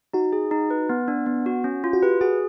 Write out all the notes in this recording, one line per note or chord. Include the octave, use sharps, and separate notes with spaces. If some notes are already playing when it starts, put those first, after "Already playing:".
D#4 F#4
G#4
D#4
B4
B3
D4
B3
F#4
C#4
F4
F#4
G4 B4
F#4 G#4